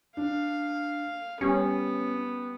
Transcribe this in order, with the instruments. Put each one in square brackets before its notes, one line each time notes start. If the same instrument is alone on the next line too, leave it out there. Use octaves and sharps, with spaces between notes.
[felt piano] D4 [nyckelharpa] F5
[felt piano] G3 [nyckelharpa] B3 [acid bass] C#4